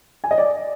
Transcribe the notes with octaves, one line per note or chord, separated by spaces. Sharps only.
G#5
D#5
D5